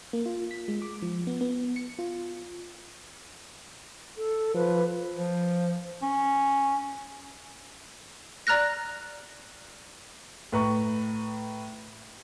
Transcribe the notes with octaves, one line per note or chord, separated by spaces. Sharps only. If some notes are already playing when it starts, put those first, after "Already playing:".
A#3
F4
B6
G#3
D6
F3
B3
B3
C#7
F4
A4
F3 B4
F3
C#4
D5 A#5 F6 F#6 A#6
A2 B4 A#5 C#6